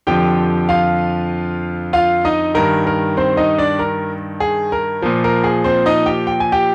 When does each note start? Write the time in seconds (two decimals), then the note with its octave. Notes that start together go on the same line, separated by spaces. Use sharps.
0.07 F2 D3 F3 G4 G5
0.69 F4 F5
1.93 F4 F5
2.25 D#4 D#5
2.55 G2 D#3 A#4
2.87 A#4
3.17 C4 C5
3.37 D#4 D#5
3.58 D4 D5
3.79 A#4
4.40 G#4
4.72 A#4
5.02 A#2 F3
5.24 A#4
5.44 G#4
5.64 C4 C5
5.86 D#4 D#5
6.06 G4 G5
6.27 G5
6.40 G#5
6.52 G4 G5